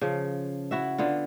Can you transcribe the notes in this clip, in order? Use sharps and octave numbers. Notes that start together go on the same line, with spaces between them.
C#3 F3
E4 F#4 E5
D3 B3 F4